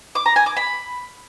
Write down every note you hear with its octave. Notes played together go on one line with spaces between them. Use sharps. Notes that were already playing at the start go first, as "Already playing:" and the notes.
D6
A#5
G#5
D6
B5